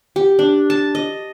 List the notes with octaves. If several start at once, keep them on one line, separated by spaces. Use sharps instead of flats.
G4
D4
A5
D#5